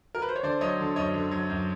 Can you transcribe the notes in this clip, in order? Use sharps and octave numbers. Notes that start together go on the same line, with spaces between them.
A#4
B4
C5
C#5
D3 C5 D5
F#3 C#5 D#5
D3
F#2 C#5 D#5
D3
F#3
F#2